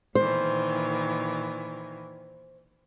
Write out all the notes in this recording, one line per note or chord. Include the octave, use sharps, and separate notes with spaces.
A#2 D#3 E3 C5